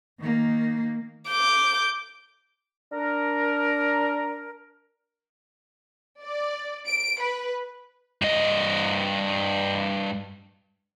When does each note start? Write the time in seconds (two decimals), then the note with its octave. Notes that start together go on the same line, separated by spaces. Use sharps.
0.20 D#3 A#3
1.29 D6 G6
2.92 D4 A#4
6.22 D5
6.87 D7
7.21 B4
8.22 G2 D#5